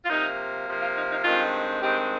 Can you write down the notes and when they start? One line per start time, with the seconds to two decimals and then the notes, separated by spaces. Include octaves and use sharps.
0.05 F4
0.09 C3 F3 A#3 D#4
0.67 C3 F3 A#3
0.81 F4
0.96 D#4
1.10 D#4
1.24 G2 D#3 G#3 C4 F4
1.82 G2 D#3 G#3 C4 G4